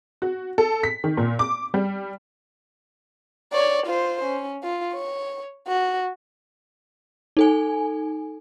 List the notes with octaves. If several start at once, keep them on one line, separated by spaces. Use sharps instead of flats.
F#4
A4
B6
D#3
A#2
D6
G3
C#5 D5
F4 C5
C#4
F4
C#5
F#4
D#4 A4 G#5